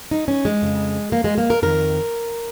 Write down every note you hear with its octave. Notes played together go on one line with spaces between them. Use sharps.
D#4
C#4
G#3
F2 C#3
A#3
G#3
A#3
A#4
F2 D#3 A#4